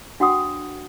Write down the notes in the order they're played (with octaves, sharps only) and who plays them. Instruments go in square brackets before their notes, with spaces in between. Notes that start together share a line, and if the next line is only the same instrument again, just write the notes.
[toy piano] D4 F#4 F#5 G5 C#6 D#6